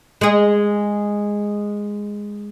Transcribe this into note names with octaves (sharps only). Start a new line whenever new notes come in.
G#3 G#4